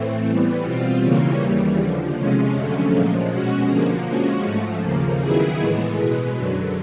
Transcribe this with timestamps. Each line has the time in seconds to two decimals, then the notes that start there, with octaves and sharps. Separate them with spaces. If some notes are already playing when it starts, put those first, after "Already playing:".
Already playing: A2 E3 A3 C4
0.27 E3 G3 B3
0.65 B2 G3 C4 F4
1.03 C#3 E3 G3 A#3 C#4
1.41 D#2 C#3 E3 G3
1.78 D#2 D3 F3
2.17 C3 F3 G#3 C#4
2.55 F2 D3 F#3 A3 C#4
2.93 A#2 F3 G#3
3.31 B2 G#3 C#4 F#4
3.69 D3 F3 A#3
4.08 F3 G#3 C#4 F#4
4.45 G#2 F3 A3
4.83 D#2 C#3 F3 A#3
5.21 D#3 F#3 B3 E4 G#4
5.59 A2 E3 G#3 B3
5.97 B2 G#3 B3
6.36 F#2 D3 F#3